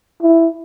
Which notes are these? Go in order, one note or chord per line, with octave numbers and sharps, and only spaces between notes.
E4